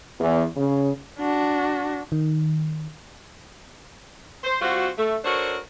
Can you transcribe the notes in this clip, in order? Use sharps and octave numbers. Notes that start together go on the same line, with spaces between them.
E2
C#3
D4 F#4
D#3
C5
G3 C4 F4 F#4
A3
D4 F#4 A4 A#4 C5 C#5